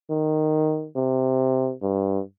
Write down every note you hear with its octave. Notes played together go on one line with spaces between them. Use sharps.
D#3
C3
G2